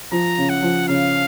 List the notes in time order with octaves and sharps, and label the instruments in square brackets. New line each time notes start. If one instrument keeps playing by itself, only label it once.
[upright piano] F3 [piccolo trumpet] A#5
[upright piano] C#3
[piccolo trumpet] F#5
[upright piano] F3
[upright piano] C#3 [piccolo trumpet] F5